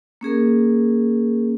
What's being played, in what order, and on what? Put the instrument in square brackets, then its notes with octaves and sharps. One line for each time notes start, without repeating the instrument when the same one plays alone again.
[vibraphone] A#3 C#4 G#4 A#4